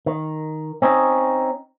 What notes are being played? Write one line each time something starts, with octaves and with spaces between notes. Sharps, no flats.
D#3
C4 C#4 D#4